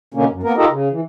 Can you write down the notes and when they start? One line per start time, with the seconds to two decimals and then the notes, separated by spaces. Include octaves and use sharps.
0.14 B2 D3 A#3 C#4
0.30 F#2
0.43 A#3 B3 A#4
0.57 D#4 F4 G4 A4 A#4 D#5
0.69 C#3
0.91 E3